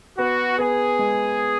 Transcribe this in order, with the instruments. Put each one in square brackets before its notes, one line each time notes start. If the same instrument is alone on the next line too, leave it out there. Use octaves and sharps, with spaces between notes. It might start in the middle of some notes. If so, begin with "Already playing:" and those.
[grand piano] B3 [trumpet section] F#4
[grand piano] B3 [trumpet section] G#4
[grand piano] G#3